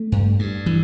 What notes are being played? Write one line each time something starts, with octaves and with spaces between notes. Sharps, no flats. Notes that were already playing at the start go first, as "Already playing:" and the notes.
Already playing: A3
G2
G2
E3